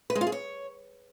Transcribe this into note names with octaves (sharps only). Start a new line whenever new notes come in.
B4
G#3
F4
G#4
C#5